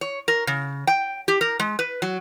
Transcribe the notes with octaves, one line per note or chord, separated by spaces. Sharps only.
C#5
A#4
C#3
G5
G4
A#4
G#3
B4
F#3